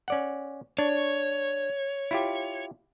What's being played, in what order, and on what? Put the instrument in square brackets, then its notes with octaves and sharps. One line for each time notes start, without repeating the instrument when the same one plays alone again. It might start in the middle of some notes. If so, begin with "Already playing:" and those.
[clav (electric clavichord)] C#4 D5 F#5
[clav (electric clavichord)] D4 [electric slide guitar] C#5
[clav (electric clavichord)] E4 F4 G4